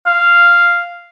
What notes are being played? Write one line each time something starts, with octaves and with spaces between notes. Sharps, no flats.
F5